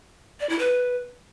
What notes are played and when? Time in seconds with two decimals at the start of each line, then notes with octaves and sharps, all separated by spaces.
0.40 D5
0.49 E4
0.59 B4